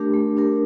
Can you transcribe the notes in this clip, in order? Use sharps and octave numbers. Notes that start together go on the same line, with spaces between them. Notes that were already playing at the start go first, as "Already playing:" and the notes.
Already playing: A3 D4 G4 A#4
A3
D4 G4 A#4